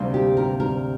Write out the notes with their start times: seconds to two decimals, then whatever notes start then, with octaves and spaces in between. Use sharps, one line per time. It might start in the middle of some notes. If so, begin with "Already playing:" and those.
Already playing: D2 C3 G3 A#3 D4
0.14 G4
0.37 A#4
0.60 A#4